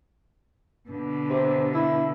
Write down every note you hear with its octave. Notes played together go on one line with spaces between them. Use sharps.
B2 D3
C3
E4